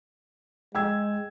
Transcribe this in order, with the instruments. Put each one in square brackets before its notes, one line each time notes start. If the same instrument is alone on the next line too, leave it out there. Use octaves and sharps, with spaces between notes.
[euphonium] G#3 [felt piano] G5 E6 G#6